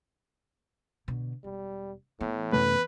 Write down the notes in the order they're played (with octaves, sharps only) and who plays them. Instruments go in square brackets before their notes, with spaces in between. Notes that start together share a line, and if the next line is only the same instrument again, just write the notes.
[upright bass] B2 D3
[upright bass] E1 [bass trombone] G3
[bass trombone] A2 [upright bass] E3 B3
[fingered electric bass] F#2 C3 A3 [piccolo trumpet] B4